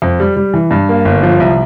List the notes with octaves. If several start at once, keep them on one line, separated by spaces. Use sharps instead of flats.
F2
G3
G3
E3
G2
A#3
G1
F3
C2